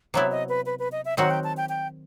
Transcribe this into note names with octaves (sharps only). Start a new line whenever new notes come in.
C3 F#3 B3 E4 E5
D#5
B4
B4
B4
D#5
E5
D#3 F#3 C4 F#4 F#5
G5
A5
G5
G5